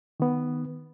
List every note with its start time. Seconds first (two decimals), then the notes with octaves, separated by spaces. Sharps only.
0.20 D#3 B3